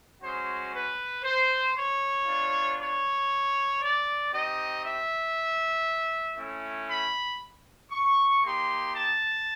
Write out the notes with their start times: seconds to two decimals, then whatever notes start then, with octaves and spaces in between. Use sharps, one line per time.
0.20 G#3 C#4 F#4 C5
0.73 B4
1.24 C5
1.75 C#5
2.26 B3 D4 F4
2.78 C#5
3.81 D5
4.32 C4 D#4 G4 D#5
4.83 E5
6.37 A3 C#4 E4
6.88 B5
7.91 C#6
8.43 A#3 D#4 G4 C6
8.94 A5